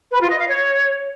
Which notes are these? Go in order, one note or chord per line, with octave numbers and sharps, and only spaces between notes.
B4
F4
D#5
F5
C#5